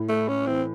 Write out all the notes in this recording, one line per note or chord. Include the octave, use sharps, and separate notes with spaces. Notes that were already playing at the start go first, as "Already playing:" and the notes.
Already playing: A2
A3
C#4
E3 C4